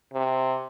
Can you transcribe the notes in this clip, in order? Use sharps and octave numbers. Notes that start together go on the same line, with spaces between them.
C3